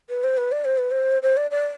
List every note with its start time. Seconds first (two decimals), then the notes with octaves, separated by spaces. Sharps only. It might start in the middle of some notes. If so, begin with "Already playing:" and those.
0.09 B4
0.24 C5
0.37 B4
0.52 D5
0.65 C5
0.78 B4
0.91 C5
1.22 C5
1.37 D5
1.51 D5